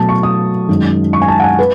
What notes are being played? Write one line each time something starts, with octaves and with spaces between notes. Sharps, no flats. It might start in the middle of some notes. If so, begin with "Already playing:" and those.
Already playing: B2 F#3 A3 A5
C#6
D#6
F#2 D#3 G#3
C#6
G#5
A5
F#5
G#5
B4